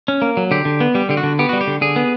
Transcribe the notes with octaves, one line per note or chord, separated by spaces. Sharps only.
C#4
A#3
F#3
D3 G4
D3
B3
G3 G4
D3 G4
F#4
D3
B3 G4
G3 F#4
G4
D3
D3 G#4
B3